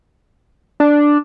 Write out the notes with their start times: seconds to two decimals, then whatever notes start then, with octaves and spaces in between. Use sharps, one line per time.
0.80 D4